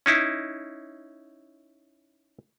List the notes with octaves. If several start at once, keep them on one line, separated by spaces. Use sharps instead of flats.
C#4 D#4 E4